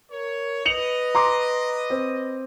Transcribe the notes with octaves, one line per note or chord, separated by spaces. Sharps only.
A#4 C#5
B4 D#5 C#7 F7 F#7
A#5 C6 D6
C4